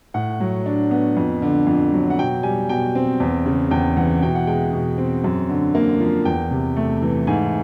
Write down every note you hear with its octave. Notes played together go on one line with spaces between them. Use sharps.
A2 F#5
F#3
D4
B3
F2
D3
F2
F#3
F#5
B2 G5
G3 G#5
B2 G5
C4
E2
C#3
E2 G5
E3 F#5
B2 G5
F#5
G#3 G5
B2
C4
F#2
D3
A#3
F3
E2 G5
C3
A3
E3
G#2 G#5